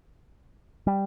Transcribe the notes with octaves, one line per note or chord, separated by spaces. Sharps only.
G3